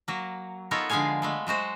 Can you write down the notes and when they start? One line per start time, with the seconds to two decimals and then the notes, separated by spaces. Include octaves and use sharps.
0.08 F#3 A#3
0.71 B3 D#4 F4 A4 A#4 C#5
0.90 D3 F3 G#3 G#4 F5 G#5
1.22 G#3 A3 B3
1.47 F#3 G#3 F#4 C5